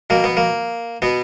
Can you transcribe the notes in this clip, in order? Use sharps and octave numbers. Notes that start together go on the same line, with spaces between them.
B2 A#3
B3
A#3
B2 B3